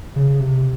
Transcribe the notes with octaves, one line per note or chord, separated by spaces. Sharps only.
C#3
C3